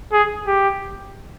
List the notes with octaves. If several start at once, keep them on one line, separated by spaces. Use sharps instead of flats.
G#4
G4